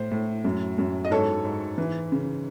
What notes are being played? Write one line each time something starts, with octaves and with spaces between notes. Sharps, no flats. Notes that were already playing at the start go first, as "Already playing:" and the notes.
Already playing: A2 C5
A2
F#2
F#2
D#5
G#2 A4 C#5
G#2
E3
C#3